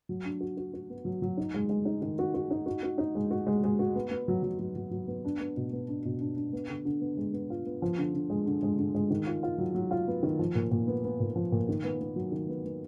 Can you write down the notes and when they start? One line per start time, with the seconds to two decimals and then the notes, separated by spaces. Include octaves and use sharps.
0.09 F#3
0.25 D4
0.41 F#4
0.57 F#4
0.74 F#4
0.90 B3
1.05 F#3
1.22 F#3
1.37 D#4
1.54 G#3
1.69 G#3
1.85 D#4
2.02 D#3
2.19 F#4
2.34 F#4
2.51 D#4
2.66 F#4
2.83 F#4
2.98 D#4
3.15 G#3
3.31 F#4
3.47 G#3
3.64 G#3
3.79 F#4
3.95 B3
4.11 B3
4.28 F#3
4.43 F#3
4.59 F#3
4.76 F#3
4.91 F#3
5.08 B3
5.25 D4
5.40 B3
5.57 B2
5.73 B3
5.88 D4
6.05 B2
6.21 D4
6.37 D4
6.53 B3
6.69 D3
6.85 D3
7.01 B3
7.17 G#3
7.33 B3
7.50 F4
7.66 B3
7.82 F3
7.98 D3
8.14 D3
8.30 G#3
8.46 D3
8.63 G#3
8.78 D3
8.95 G#3
9.10 D#3
9.27 F4
9.43 F4
9.58 F#3
9.75 F#3
9.91 F4
10.08 B3
10.23 D#3
10.39 F3
10.55 A#2
10.71 A#2
10.87 B3
11.04 B3
11.20 A#2
11.36 F3
11.52 A#2
11.69 D#3
11.84 B3
12.01 B3
12.16 F#3
12.32 D#3
12.49 B3
12.65 B3